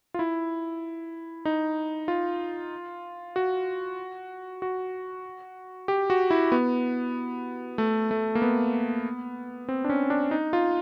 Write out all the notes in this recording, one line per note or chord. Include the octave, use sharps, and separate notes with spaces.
F4
E4
D#4
F4
F#4
F#4
G4
F#4
E4
B3
A3
A3
A#3
B3
C4
D4
C#4
D4
D#4
F4